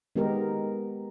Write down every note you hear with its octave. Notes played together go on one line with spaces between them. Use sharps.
D#3 G#3 B3 D#4 G4 A#4